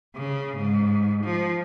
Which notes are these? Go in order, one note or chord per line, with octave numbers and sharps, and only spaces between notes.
C#3
G#2
F3